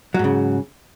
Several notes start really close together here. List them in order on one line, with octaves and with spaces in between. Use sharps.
F#3 G#2 C#3